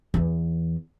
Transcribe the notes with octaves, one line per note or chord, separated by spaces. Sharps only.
E2 E3